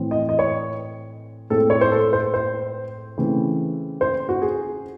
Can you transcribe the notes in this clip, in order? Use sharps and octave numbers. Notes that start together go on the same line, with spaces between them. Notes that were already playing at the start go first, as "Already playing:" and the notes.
Already playing: A2 E3 C4
D#5
D#5
C#5
A2 G#3 C4 A4
C#5
C5
A4
C5
C5
C#3 E3 A3 C4
C5
F#4
G#4